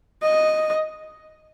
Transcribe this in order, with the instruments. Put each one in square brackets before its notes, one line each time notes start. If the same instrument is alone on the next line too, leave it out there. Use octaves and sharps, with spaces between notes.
[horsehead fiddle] D#5